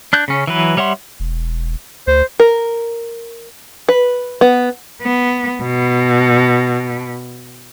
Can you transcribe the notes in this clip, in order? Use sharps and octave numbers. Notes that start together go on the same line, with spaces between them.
D4 F#6 G6
C#3 C#4
E3 F#3 B4
G3 C#5 E5 F#5 C6
E1
D2 C5
A#4
B4
B3
B3
B2